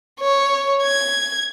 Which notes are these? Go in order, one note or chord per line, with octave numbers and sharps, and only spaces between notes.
C#5
G#6